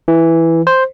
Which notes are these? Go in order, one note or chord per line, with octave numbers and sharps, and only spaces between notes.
E3
C5